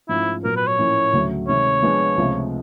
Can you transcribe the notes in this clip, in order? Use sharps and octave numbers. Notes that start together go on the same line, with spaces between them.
G#2 F3 A3 C#4 E4 F4
A#2 F#3 B3 A#4
B4
C#5
A2 F3 A#3 C#4 E4
D2 C#3 F#3 A3
C3 D#3 G#3 C#5
F3 G#3 B3 D4 F4
C#2 C3 F3 A3